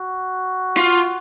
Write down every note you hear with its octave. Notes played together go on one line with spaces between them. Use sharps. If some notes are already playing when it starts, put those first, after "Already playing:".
Already playing: F#4
F4